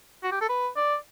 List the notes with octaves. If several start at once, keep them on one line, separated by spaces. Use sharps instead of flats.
F#4
G4
A4
B4
D5